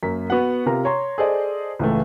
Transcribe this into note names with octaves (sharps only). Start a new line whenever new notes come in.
F#2 A#3 B6
B3 F#4 F#5
C3 F4 A#4 A#5
C#5 A#5 C6
G#4 A4 C5 D5 D#5
C#2 A2 C#3 E3 A3